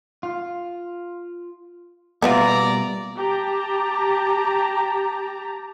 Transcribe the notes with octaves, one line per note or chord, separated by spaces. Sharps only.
F4
B2 G3 A#3 B3 E4 F4 D5 A#5
G4 A5 A#5